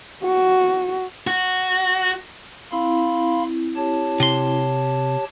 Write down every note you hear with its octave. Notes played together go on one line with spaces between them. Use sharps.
F#4
F#4
C4 E4 F5 B5 C6
G4 C#5 A5
C3 C6